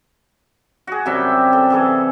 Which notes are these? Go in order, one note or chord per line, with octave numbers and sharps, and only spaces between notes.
F#4 G#4
F#2 C3 G3 E5
A4
E3 G#4 A4